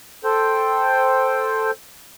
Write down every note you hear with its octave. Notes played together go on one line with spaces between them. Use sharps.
A4 C5 G5